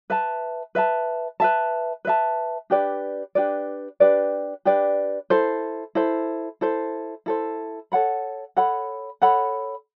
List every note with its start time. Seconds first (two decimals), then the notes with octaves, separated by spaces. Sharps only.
0.10 B4 E5 A5
0.75 B4 E5 A5
1.40 B4 E5 A5
2.05 B4 E5 A5
2.70 D4 G4 B4 D5
3.35 D4 G4 B4 D5
4.00 D4 G4 B4 D5
4.65 D4 G4 B4 D5
5.30 E4 A4 C5
5.95 E4 A4 C5
6.61 E4 A4 C5
7.26 E4 A4 C5
7.92 A4 C#5 F#5 B5
8.57 A4 C#5 F#5 B5
9.22 A4 C#5 F#5 B5